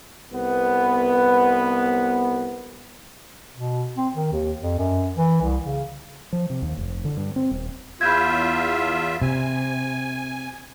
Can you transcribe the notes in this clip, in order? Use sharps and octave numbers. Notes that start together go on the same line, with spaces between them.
C2 B3
B2
C4
D#3
D#2
F2
F#2
E3
C2
C#3
F3
C3
D#2
F1
D3
G2
C4
D#1
E2 F4 E5 B5 G6 G#6
C3 G#5